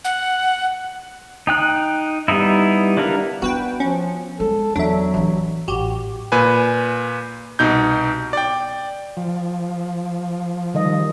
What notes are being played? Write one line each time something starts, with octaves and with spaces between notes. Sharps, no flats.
F#5
D#4 G5 F#6
G3 B3 D#4 E4
D4 E4 A#4 F5
B3 D4 F#4 B4 G5
F3 C#4
G#3 A4
E2 F#3 D4 E5
A1 E3 D4
A1 F#4 G4
A#2 B4 G#5
C2 B2 D#4 G6
D5 G5
F3
D#3 G3 D#5